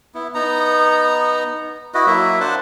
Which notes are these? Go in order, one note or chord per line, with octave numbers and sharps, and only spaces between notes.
B3 E4
B3 D#4 A#5
E4 F#4 B4 D#5
F#3 A#3 E4 E5
D4 C5 F#5 A5